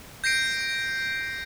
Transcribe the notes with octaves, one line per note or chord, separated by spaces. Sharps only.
G6 A#6 C7 D7